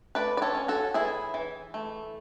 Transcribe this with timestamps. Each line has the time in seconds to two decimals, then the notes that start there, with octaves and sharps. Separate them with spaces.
0.15 A3 B4 D5
0.37 D5
0.42 A4 C#5
0.55 C#4
0.68 F#4 A4
0.94 E3 E4 G#4
1.34 E3
1.74 A3